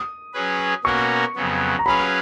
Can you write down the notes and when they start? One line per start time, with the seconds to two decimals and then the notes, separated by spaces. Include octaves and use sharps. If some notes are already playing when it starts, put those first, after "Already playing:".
Already playing: D#6
0.33 F#3 C#4 G#4 B4
0.84 B2 A#3 C#4 F#4 A#4 C#6
1.35 F2 C#3 F#3 B3
1.79 A#5
1.86 F#3 C#4 G#4 B4 F5 B5